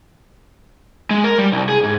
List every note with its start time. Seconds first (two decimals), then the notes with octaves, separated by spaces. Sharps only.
1.11 G#3
1.24 A#4
1.38 G3
1.52 C2
1.69 G#4
1.83 G#2